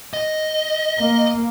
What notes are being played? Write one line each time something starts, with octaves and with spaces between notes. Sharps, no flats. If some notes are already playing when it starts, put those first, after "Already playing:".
D#5
A#3